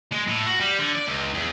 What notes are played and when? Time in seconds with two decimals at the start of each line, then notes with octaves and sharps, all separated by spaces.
0.12 G#3
0.28 A2
0.46 F#4
0.60 G3
0.79 D3
0.95 D5
1.07 C#2
1.34 E2